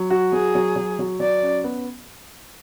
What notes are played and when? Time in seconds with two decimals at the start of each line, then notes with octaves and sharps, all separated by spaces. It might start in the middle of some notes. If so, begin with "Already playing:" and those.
Already playing: F#3
0.10 F#4
0.33 F#3 G#4
0.55 F#3
0.76 F#3
0.99 F#3
1.20 F#3 D5
1.42 C#4
1.64 B3